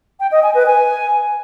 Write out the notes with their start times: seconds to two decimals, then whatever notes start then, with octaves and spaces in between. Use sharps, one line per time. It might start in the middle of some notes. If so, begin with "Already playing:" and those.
0.20 G5
0.31 D#5
0.43 G#5
0.55 B4
0.66 G#5